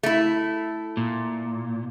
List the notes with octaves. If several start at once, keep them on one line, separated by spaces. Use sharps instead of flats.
A3 E4
A#2